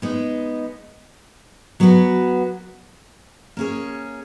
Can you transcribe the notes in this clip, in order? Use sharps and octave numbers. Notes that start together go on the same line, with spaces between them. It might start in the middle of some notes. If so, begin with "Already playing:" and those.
G#3 B3 D#4
F#3 B3 F#4 B4
A#3 C#4 G#4 C#5